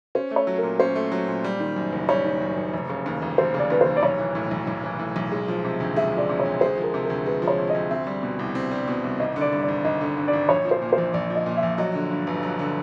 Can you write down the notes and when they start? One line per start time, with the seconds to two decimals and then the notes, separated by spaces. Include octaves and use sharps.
0.15 C#4 C5
0.31 A3
0.36 C#5
0.47 F#3
0.58 A#4
0.63 A#2
0.79 C#4 C5
0.95 A3
1.12 F#3
1.28 A#2
1.44 G3
1.60 D#3
1.76 F#2
1.92 F#1
2.09 G3 C#5
2.25 D#3
2.41 F#2
2.57 F#1
2.73 F1
2.90 C#3
3.06 D#2
3.22 F1
3.38 F1 C5
3.54 C#3
3.59 D5
3.70 D#2 B4
3.81 C5
3.86 F1
3.97 D5
4.03 B1 C#5
4.19 E3
4.35 A2
4.51 B1
4.67 B1
4.84 E3
4.99 A2
5.16 B1
5.32 G#3
5.48 F3
5.64 C3
5.80 D2
5.96 G#3 E5
6.13 F3
6.18 D5
6.29 C3
6.40 C#5
6.45 D2
6.61 G#3 C5
6.78 F3
6.83 A#4
6.94 C3
7.05 A#4
7.10 D2
7.26 G#3 B4
7.42 F3
7.48 C#5
7.58 C3
7.69 D#5
7.74 D2
7.90 C4 E5
8.07 G3
8.23 B2
8.39 C2
8.55 C4
8.71 G3
8.88 B2
9.04 C2
9.20 G#1 D#5
9.36 D3
9.41 D5
9.52 G2
9.63 D5
9.68 G#1
9.85 G#1 D#5
10.01 D3
10.17 G2
10.28 D5
10.33 G#1
10.49 A#1 C#5
10.65 F3
10.71 C5
10.82 A#2
10.93 C5
10.98 A#1
11.13 A#1 D5
11.30 F3
11.35 D#5
11.46 A#2
11.57 E5
11.63 A#1
11.78 F#3 D#5
11.95 D3
12.11 G2
12.27 G1
12.43 F#3
12.59 D3